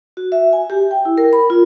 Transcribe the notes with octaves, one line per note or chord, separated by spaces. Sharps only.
F#4
E5
G#5
G4
G5
E4
A#4
B5
F4